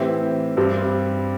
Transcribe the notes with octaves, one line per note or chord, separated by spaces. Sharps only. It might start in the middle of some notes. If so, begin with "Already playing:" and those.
Already playing: A2 E3 C4 G4
G2 G3 C4